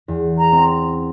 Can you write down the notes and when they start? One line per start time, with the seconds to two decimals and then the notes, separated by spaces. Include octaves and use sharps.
0.08 E2
0.38 A#5
0.52 C4